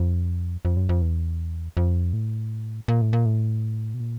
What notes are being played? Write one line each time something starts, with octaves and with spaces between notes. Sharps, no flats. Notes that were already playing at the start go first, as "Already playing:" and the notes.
Already playing: F2
F2
F#2
F2
E2
F2
A2
A#2
A2
A#2
A2
B2
A#2